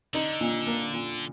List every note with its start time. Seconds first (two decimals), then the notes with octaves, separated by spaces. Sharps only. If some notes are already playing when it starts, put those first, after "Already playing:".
0.14 D3 D#4
0.41 A#2
0.67 A#3
0.93 A#2